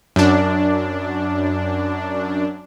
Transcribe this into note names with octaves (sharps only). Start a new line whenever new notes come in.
F#2 D4